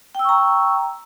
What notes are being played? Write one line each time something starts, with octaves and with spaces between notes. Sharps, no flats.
G5 A#5 C#6 E6